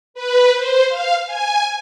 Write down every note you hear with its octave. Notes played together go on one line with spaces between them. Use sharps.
B4
C5
F5
G#5